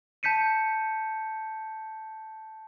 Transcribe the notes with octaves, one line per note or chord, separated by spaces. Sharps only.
A5 G6 B6 C#7 D#7